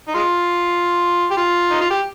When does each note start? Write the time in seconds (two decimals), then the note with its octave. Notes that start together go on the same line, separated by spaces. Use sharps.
0.08 D#4
0.15 G#3 F4
1.31 G4
1.38 F4
1.71 D#4
1.81 F4
1.91 G4